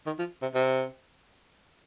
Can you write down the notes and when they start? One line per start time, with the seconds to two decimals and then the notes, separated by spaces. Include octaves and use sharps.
0.06 D#3
0.19 F3
0.42 C3
0.54 C3